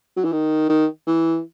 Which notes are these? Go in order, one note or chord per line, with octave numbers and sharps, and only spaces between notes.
F#3
E3
D#3
D#3
E3